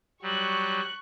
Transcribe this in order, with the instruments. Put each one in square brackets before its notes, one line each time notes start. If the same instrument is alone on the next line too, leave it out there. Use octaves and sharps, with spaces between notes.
[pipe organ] F#3 G3 [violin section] C#6 F#6